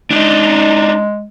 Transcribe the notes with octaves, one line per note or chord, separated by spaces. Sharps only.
G#3 D4 D#4